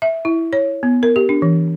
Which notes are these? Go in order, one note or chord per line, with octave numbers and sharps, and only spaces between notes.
E5
E4
C#5
B3
A#4
G4
D4
E3